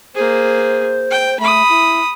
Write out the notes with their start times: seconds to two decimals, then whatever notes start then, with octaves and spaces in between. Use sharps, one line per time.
0.15 A#3 G#4 C5
1.11 G5
1.40 A3 B5 D#6
1.69 E4